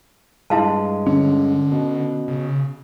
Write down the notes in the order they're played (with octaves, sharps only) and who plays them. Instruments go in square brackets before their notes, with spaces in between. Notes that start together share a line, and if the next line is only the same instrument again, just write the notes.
[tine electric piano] G2 G#3 [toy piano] E4 F5 A5
[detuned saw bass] D3 [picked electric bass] C#4
[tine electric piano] B2
[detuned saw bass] C#3